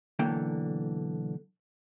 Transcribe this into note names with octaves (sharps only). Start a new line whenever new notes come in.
B1 D3 E3 A#3 G5